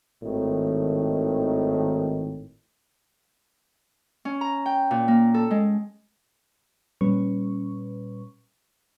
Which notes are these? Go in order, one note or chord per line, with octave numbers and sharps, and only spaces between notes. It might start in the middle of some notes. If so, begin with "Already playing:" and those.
G#1 A2 D#3
C#4
A#5
G5
A#2
A#3
A4
G#3
A#2 G3 C#4 B4 C#6